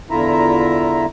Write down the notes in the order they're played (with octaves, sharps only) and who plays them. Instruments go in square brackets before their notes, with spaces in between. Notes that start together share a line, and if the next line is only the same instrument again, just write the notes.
[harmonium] E2 D3 E4 F4 E5 A#5